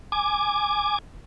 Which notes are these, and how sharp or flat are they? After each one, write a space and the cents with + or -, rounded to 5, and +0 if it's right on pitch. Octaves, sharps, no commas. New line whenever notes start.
G#5 +0 D6 +15